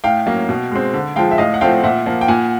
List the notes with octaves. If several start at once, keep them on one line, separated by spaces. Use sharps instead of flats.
A2 F5 G5
F#3 A#3 C#4
B2
G#3 C4
D3
F3 G#3 F5 G5
E5
A2 D#5 F5
F#5
F3 A3 C4 F5 G5
A#2 E5 F#5
F3 A#3
G5
A#2 F#5 G#5